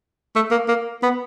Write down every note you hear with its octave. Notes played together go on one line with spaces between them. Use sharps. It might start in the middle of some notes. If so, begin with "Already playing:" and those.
A3
A#3
A#3
B3